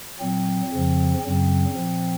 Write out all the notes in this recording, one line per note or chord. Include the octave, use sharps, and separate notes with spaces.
A#2 F#3 C4
F2 C#3 F3
F#2 C#3 F#3 C4
A#2 F3